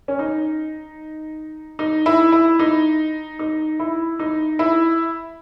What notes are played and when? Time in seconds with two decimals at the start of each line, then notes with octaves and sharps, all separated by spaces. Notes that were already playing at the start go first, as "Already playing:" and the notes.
0.08 C#4
0.19 D#4
1.79 D#4
2.06 E4
2.32 E4
2.59 D#4
3.39 D#4
3.79 E4
4.19 D#4
4.59 E4